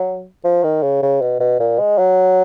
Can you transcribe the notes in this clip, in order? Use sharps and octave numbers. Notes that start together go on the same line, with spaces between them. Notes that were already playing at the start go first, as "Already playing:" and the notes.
Already playing: F#3
F3
D#3
C#3
C#3
B2
B2
A#2
G#3
F#3